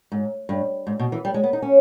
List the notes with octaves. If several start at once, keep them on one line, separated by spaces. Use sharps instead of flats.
G#2
G2
G#2
B2
E3
G3
G#3
B3
D#4
C#4